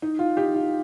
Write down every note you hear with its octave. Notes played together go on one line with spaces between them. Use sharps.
D#4
F4
D#4 G4
F4